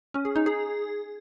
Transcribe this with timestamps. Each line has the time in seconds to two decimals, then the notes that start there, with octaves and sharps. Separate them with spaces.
0.14 C#4
0.25 G#4
0.36 D#4
0.46 G#4